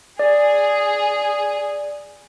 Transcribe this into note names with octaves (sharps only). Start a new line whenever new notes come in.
G#4 D5